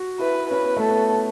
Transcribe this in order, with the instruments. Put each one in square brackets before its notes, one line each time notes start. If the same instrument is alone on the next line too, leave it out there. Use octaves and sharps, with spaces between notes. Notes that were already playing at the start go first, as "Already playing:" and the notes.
Already playing: [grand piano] F#4
[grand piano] E4 [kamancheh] B4
[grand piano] C#4 [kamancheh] B4
[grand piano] B3
A3
[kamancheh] A4
[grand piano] B3